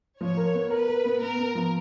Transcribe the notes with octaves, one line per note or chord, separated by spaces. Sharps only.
F3 C#5
A#4
B3
A#4 B4
A#4
B3
B3 A#4
B3
F3